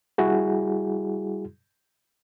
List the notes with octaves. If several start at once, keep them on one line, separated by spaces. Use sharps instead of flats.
G3 E4 F#4 G#4